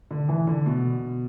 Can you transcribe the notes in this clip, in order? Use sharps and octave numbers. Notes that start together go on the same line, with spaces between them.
D3
E3
D3
B2